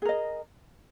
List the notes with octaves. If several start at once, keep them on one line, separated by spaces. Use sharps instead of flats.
G#4 A#4 D#5